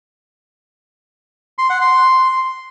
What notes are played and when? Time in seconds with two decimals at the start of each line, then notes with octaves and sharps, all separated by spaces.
1.58 C6
1.70 F#5
1.81 C6